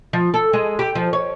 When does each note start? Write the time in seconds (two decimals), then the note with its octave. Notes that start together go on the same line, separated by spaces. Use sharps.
0.13 F3
0.34 A4
0.53 G#3
0.79 G4
0.95 F3
1.13 C#5